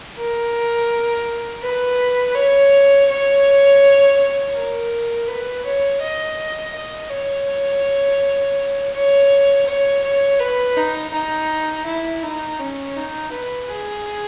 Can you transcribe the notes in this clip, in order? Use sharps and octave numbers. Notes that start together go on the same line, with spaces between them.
A#4
B4
C#5
C#5
A#4
B4
C#5
D#5
D#5
C#5
C#5
C#5
C#5
B4
D#4
D#4
E4
D#4
C#4
D#4
B4
G#4